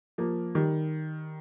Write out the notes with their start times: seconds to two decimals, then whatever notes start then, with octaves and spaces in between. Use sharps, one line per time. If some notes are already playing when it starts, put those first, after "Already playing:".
0.18 F3 A#3
0.55 D#3 G3